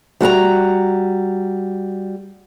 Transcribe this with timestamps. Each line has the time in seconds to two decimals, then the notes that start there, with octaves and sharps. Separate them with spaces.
0.21 G3 F#4 A5 A#5